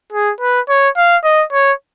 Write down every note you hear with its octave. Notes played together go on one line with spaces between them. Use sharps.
G#4
B4
C#5
F5
D#5
C#5